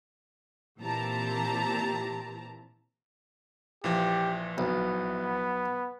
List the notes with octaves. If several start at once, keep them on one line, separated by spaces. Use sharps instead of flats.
A#2 E3 C4 G4 A5 A#5
A#1 E3 F3 G4
B1 B3